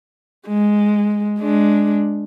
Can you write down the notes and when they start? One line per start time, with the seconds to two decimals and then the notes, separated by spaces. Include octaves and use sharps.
0.48 G#3
1.40 G#3 D4